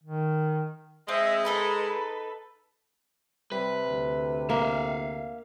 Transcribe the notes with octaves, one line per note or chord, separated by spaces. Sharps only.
D#3
G#3 C4 D#5 E5
D#4 A4 B4 B5
C3 G3 B4
D2
A#3 E5 F5